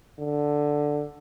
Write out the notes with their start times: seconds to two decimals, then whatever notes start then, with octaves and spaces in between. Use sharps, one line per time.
0.20 D3